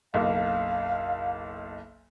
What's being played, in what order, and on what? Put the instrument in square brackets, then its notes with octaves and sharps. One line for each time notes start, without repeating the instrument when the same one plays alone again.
[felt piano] F#1 B1 [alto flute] F5